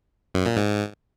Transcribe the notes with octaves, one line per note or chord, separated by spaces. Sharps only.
F#2
A#2
G#2